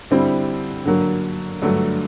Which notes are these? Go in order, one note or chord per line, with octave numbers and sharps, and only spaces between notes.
D3 G3 C4 E4
D3 F#3 A#3
G2 D3 F#3 A3